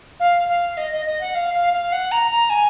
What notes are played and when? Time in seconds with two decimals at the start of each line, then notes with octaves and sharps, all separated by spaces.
0.20 F5
0.48 F5
0.77 D#5
0.92 D#5
1.06 D#5
1.21 F#5
1.35 F5
1.54 F5
1.73 F5
1.92 F#5
2.12 A#5
2.31 A#5
2.50 G#5